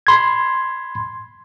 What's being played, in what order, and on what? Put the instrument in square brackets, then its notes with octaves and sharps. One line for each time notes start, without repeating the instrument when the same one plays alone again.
[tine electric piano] B5 C6 G#6